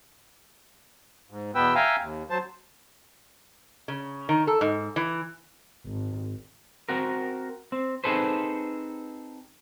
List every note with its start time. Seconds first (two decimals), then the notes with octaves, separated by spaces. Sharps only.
1.31 G#2
1.55 E2 B2 B3 B4 G5 E6
1.75 E5 F5 G5 G#5 A#5
2.00 D#2
2.30 F#3 C5 A5
3.88 C#3
4.29 D#3
4.47 A4
4.61 G#2
4.96 E3
5.86 G#1
6.89 C4 F#4 A#4
7.72 C4
8.04 C4 D#4 G#4 A4 B4 C5